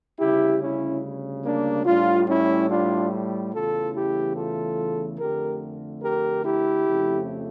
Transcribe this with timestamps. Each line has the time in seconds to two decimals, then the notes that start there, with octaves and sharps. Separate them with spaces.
0.19 D2 C#3 G3 E4 G4
0.61 C#4 E4
1.45 A#3 D4
1.86 A2 G3 D4 F4
2.27 C#4 E4
2.70 D4 F4
3.53 E2 C#3 E3 A3 F4 A4
3.94 E4 G4
4.36 F4 A4
5.19 F2 D3 A3 G4 A#4
6.03 G4 A#4
6.45 E4 G4
6.86 F2 C#3 F3 A3